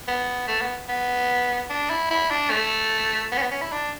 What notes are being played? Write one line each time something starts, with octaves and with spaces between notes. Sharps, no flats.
B3
A3
B3
B3
D4
E4
E4
D4
A3
B3
C#4
B3
C#4
E4
D4